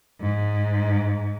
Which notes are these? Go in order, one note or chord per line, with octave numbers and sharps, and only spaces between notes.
G#2